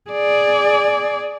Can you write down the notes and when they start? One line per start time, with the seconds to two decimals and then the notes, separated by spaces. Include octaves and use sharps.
0.10 G#4 D5